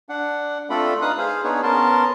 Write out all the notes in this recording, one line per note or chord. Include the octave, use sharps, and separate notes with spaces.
D4 F#5
A3 C4 D4 F4 A4 B5
D#4 B4 F5 D#6 F#6
G#4 C5 F5
B3 D4 D#4 G#4 B4 C#5
B3 C#4 A#4 A5 C6